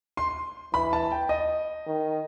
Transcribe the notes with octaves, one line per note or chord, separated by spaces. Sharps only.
C6
E3 B5
A5
G5
D#5
D#3